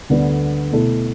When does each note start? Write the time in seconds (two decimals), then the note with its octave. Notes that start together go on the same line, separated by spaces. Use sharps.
0.10 D2 D3 G3 B3
0.72 B2 A3 E4 A4